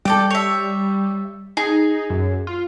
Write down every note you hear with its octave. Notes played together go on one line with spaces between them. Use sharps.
G3 A4 D5 G5
C#5 E5
D#4 G#4
F#2
F4